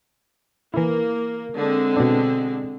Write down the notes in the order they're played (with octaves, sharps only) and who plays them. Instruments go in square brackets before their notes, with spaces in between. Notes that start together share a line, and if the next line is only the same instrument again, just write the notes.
[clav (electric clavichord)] E3 E4 [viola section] A#3
[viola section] D3 G#3 C4
[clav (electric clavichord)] B2 D4